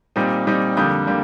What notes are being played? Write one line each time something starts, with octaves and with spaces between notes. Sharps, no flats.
A#2 G3 C4 D#4
A#2 G3 C4 D#4
F2 D3 G3 A#3 D#6 G6
D3 G3 A#3